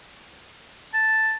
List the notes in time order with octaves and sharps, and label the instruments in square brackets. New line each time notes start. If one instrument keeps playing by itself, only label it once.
[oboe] A5